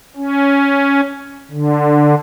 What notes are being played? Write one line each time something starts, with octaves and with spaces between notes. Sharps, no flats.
C#4
D3